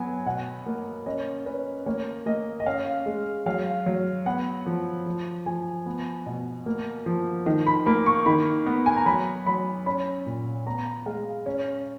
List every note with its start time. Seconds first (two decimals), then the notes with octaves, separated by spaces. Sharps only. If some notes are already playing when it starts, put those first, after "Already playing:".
Already playing: F#3 B3 G#5
0.26 B2 F#5
0.66 A#3
1.06 C#4 D#5
1.46 C#4 B4
1.86 A#3 C#5
2.26 A#3 D#5
2.60 D#5
2.66 C#4 F5
3.06 G#3
3.46 F#3 F5
3.86 F#3
4.26 B3 F#5
4.66 F3
5.06 F3
5.46 F3 G#5
5.86 B3
6.26 B2
6.66 A#3
7.06 F3
7.46 D#3
7.67 B5
7.86 A#3 B5
8.06 C#6
8.26 D#3 B5
8.66 B3
8.86 G#5
8.96 A#5
9.06 F#3 B5
9.46 F#3 B5
9.86 C#4 B5
10.26 A#2
10.67 B3 A#5
11.06 G#3 F5
11.46 C#4